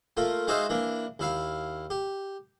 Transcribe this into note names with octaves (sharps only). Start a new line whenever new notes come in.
A3 A#3 F4
G#3 D#4 F#4 C5 E5 F5
E3 A#3 D4
D#2 E4 F5
G4